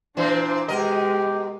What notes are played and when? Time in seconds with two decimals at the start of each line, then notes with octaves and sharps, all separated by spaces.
0.17 A#2 E3 C4 D4 C5
0.68 B2 G#3 G4 A#4 D#5